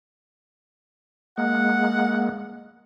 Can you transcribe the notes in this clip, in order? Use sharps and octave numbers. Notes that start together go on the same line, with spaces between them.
G#3 A#3 F#5